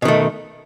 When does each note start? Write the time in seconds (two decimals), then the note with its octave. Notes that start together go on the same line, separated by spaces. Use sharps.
0.02 B2
0.05 D#3
0.08 A3